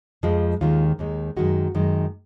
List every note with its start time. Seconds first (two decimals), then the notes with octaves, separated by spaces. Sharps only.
0.23 F2 F3 G#3
0.61 D#2 D#3 G#3 F4
0.99 D#2 D#3 G#3
1.37 F#2 D#3 G#3 F#4
1.75 F#2 D#3 G#3